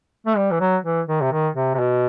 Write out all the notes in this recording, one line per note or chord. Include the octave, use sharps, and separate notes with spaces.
A3
G3
E3
F#3
E3
D#3
C3
D#3
C3
C3
B2